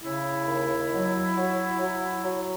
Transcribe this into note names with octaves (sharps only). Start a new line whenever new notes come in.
C#3 E4
D#2
F#3
F#3
F#3
F#3